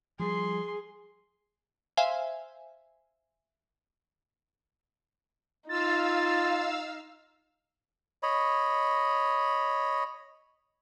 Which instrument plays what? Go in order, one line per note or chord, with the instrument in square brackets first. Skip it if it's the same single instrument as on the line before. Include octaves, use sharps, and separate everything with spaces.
[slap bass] F3 G3 [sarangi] G#4 [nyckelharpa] C6
[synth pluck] C5 E5 F5 G#5
[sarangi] D#4 [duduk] F4 [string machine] F5 E6 [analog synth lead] A6
[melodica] C#5 D#5 B5